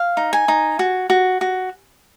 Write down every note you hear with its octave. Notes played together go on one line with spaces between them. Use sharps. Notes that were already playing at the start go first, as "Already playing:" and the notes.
Already playing: F5
D#4
G#5
D#4
F#4
F#4
F#4